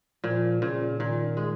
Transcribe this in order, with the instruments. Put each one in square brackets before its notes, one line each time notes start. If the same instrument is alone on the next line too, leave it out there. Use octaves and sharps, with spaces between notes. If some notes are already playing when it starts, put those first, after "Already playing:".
[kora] A#2 [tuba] F3
[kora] A#2 [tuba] C#3
[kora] A#2 [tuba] D#3
[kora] G#3